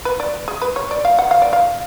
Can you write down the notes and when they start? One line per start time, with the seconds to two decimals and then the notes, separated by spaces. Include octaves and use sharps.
0.05 B4
0.20 D5
0.48 G#4
0.62 B4
0.76 C#5
0.91 D5
1.05 F5
1.19 F#5
1.31 F5
1.42 D5
1.53 F5